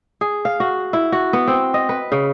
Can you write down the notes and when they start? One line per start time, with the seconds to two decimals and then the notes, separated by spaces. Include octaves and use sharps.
0.21 G#4
0.45 F5
0.60 F#4
0.93 E4
1.12 F#4
1.33 B3
1.47 C4
1.74 D#5
1.89 B4
2.12 C#3